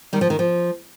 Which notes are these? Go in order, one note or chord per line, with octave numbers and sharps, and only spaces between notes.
D#3 G3
F3
D#3
F3